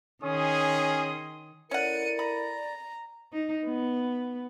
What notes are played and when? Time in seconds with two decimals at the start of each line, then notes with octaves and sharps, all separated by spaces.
0.23 D#3 C#4 G#4 C6 D#6
1.71 C#4 E4 A4 A#4 D5 F#5 C#7 D#7
2.19 A#5 B5
3.32 D#4
3.65 B3